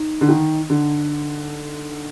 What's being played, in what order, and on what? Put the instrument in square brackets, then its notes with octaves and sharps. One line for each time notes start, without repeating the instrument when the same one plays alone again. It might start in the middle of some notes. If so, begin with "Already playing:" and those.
Already playing: [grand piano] D#4
[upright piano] D3
D#3
D3